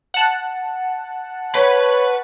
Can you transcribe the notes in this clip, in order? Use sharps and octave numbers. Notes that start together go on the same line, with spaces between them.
F#5 A5
B4 C#5 B5